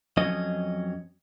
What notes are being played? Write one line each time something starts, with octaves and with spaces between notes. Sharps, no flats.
F2 F#3 C#4 D#5